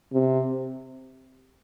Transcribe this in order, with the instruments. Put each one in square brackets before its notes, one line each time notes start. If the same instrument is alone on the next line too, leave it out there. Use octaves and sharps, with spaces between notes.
[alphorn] C3